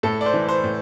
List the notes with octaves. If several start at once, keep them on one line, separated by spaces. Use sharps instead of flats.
A2 A4
D5
C5
E3
C5
A2